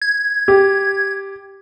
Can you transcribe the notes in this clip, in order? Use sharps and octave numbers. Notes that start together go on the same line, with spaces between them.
G#6
G4